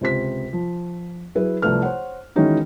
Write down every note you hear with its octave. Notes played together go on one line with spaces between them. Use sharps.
C#2 C3 C5 B6
F3
F#3 E4 G#4 B4
C2 F3 A3 A4 B4 F6
C5 C#5 F#5
D#3 E3 G#3 C#4 D#4 F#4